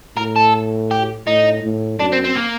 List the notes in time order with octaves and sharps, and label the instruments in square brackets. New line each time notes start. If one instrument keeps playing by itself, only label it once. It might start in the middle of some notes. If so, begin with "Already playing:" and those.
[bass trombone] A2 [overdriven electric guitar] A#4
[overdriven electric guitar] A4
G4
[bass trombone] A2 [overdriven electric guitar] D#4
[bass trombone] A2
[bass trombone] F#2 [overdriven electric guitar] D4
[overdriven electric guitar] C4
C4
A#3